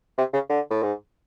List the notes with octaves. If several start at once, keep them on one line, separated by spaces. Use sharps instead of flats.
C3
C#3
D3
A2
G#2